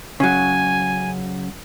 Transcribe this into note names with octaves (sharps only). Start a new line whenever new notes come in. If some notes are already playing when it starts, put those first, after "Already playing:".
C#3 F#3 G#5